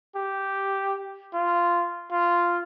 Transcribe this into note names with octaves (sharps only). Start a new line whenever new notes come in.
G4
F4
F4